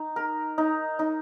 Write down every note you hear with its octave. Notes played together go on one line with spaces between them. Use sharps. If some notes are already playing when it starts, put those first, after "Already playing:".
Already playing: D#4
A#4
D#4
D#4